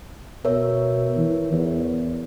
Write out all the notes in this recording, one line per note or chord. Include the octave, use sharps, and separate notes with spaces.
B2 A#4 C#5 E5
E3
E2